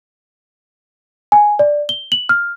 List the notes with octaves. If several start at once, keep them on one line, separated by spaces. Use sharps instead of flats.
G#5
D5
G7
F#7
F6